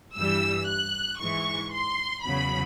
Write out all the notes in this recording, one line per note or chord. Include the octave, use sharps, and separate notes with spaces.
G2 E3 G3 E6
F#6
G#2 E3 G#3 C#6
C6
E2 C#3 F#3 B5